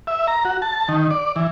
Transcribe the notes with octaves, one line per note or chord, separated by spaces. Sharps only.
E5
A#5
F#4
A5
D#3
D5
E3